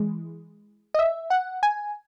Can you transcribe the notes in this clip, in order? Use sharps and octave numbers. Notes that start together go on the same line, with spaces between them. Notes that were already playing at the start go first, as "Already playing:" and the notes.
Already playing: E3 G#3
D#5
E5
F#5
G#5